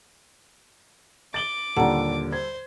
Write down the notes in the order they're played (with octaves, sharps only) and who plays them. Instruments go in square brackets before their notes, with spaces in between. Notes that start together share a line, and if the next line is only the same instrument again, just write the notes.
[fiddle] D6 [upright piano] A6 F#7 G7
[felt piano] D#2 A#2 D3 [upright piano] G3 A4 [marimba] F#5 A#5
[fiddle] C5 [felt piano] G#6